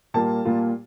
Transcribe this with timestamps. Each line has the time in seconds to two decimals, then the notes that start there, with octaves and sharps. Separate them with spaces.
0.14 A#2 G3 A#3 F4 A5
0.45 A#2 G3 A#3 F4